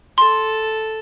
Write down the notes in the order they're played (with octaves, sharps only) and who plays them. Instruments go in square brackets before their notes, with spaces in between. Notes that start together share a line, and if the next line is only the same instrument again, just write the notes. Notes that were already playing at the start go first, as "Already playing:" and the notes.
[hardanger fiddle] A4 [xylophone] C6